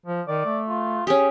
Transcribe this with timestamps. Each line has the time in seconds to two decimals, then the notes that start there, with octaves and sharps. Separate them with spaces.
0.06 F3
0.28 D#3 D5
0.46 A3
0.69 F4
1.07 C#4 G4 G#4